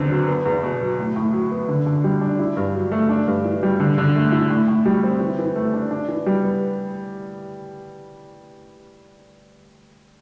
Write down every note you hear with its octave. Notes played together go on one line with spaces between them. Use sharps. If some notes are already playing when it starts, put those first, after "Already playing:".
Already playing: E2 D3 C4
F#3
B3
E2
B2
F#3
A2
A2
F#3
B3
D3
D3
G3
D4
E4
G2
F#3
A3
D4
G2
E3
G3
D3
D3
A3
E4
A2
A2
G3
C4
E3
E3
A3
D4
D4
E3
G3
B3